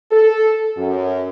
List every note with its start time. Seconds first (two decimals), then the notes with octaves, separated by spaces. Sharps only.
0.12 A4
0.76 F#2